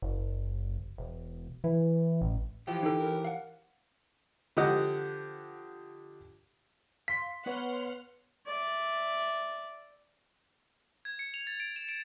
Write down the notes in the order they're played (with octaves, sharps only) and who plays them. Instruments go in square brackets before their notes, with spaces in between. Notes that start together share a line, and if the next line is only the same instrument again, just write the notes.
[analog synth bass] F#1
E1
E3
A1
[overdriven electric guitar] E3 [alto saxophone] F3 [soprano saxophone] G4
[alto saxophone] D3 [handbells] D#4 A4
[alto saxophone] A#4
[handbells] F5 F#5
[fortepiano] D3 F3 G4 D#5 F#5
[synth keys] F5 C6 [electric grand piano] B6
[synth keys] B3 B4 C#5 [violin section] F#5 C6 F6
[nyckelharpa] D5 E5
[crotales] G#6
C#7
F7
A6
D7
E7
D7